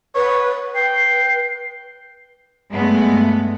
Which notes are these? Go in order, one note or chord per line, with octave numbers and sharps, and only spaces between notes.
B4 C#5
B4 G5 C7
G2 G#3 A3 B3